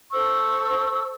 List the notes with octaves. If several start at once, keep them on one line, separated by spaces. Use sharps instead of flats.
A4 C5 C#6 E6